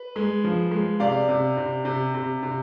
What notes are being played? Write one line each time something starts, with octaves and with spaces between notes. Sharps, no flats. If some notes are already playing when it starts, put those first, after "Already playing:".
Already playing: B4
G#3
F3
G#3
C3 D5 F5
C3
C3
C3
C3
C3